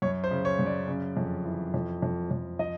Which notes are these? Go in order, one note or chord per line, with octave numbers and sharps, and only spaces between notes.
F#2 C#5
C5
C#3
C#5
F#2
D5
C#3
F2
E3
F2
F2
F2
F3 D#5